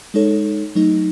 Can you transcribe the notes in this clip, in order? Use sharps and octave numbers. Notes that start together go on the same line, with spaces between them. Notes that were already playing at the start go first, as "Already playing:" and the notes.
G#3 D#4 A4 C#5
F#3 A3 D#4